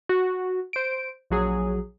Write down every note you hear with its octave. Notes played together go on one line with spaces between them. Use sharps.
F#4
C5 D7
A#1 F#3 G#4